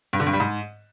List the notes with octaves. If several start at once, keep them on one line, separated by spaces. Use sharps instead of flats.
G2
D3
G2
G3
G#2